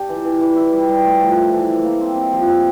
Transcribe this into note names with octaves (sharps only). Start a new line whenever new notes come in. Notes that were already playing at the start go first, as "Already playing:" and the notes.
Already playing: D4 G4
E3
E3
E3
E4
G3
G3
A3
F3
E4
E3
E4
A#3
C4
C3
F3
C4